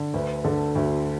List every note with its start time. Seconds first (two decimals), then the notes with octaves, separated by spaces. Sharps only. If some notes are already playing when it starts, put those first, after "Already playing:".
Already playing: D3
0.14 D2 B4
0.44 D3 A4
0.75 D2 F#4